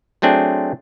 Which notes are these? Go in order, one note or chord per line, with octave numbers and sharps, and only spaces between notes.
F#3 A3 C4 D4 G#4